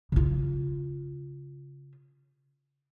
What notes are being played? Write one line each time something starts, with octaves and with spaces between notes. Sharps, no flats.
C#3 F4